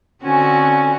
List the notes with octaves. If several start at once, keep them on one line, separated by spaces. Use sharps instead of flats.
D3 C4 C#4 F#4 G#5